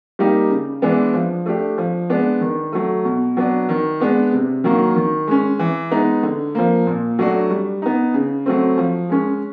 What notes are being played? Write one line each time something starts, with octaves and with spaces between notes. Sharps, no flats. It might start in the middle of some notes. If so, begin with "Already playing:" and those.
G3 A#3 D#4 G4
C#3
E3 G#3 B3 D4
F3
A3 D4 G4
F3
G#3 B3 D4
D#3
F#3 A3
B2
F#3 B3 D4
D#3
G#3 B3 D4
C3
D#3 F#3 A#3
D#3
G#3 C#4
E3
G#3 B3 D#4
D3
F3 A#3
A#2
F#3 A3 D4 F#4
G3
B3 D#4
C#3
F#3 A3 C4
F3
G#3 C#4